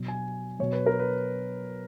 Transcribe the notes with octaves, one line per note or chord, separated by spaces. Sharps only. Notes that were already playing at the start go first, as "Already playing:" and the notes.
Already playing: B2 F#3
G#5
B2 F#3 C#5
B4
A#4
B4